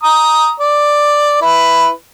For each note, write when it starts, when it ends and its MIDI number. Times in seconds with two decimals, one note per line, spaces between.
0.03 0.53 82
0.03 0.53 87
0.60 1.37 74
1.42 1.90 64
1.42 1.90 71